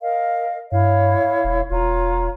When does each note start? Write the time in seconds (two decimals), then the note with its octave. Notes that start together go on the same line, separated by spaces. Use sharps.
0.01 A#4 D#5 F5
0.72 G2 E4 C#5 F5
1.44 E1
1.71 E1 F4 C#5 A#5